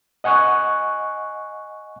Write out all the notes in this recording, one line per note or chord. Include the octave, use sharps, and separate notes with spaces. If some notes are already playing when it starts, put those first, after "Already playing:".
D#5 F#5 G#5 C#6 F#6